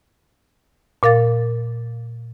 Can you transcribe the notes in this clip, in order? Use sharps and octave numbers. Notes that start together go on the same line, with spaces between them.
A#2 A#4 F5 A6